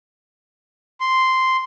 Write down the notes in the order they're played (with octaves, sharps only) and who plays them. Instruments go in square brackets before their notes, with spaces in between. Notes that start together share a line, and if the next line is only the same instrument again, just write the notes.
[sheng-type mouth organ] C6